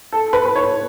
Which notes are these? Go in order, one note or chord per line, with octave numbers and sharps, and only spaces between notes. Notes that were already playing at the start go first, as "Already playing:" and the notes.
A4
B4
B4
C#5